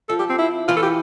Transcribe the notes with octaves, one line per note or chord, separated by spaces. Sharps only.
F3 A4
G4
C4
E4
E3 F4
A4
G4